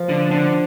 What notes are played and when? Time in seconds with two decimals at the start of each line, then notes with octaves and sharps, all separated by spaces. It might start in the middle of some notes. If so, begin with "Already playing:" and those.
Already playing: F3
0.09 D3
0.31 D3